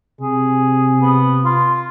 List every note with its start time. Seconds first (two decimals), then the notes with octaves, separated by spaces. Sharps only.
0.21 C3 G#4
1.01 B3
1.45 F4